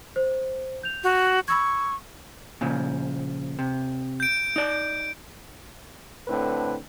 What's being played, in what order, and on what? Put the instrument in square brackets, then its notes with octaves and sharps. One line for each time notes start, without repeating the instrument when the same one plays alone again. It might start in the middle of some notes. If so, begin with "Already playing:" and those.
[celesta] C5
G6 F7
[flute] F#4
[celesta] B5 E6 G#6 [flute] C#6
[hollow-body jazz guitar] A#2 C#3 F3
C3
[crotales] G6 D7
[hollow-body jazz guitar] D#4 D5
[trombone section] A2 D3 C4 B4